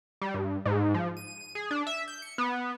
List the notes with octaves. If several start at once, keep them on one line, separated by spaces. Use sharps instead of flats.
G3
G2
G#2
F3
D#7
G#4
D4
E5
G6
C#7
B3